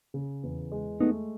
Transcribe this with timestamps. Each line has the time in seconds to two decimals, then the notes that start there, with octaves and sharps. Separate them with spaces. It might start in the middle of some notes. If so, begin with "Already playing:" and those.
0.14 C#3
0.43 E2
0.72 G#3
1.00 A3 B3 D#4